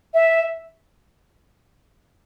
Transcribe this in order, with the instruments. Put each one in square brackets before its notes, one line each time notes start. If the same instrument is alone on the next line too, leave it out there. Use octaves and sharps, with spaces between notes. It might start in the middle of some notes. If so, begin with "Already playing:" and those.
[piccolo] E5